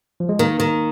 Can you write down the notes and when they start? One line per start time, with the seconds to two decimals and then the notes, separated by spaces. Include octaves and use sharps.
0.20 F3
0.29 G#3
0.39 D#3 A#3
0.60 D#3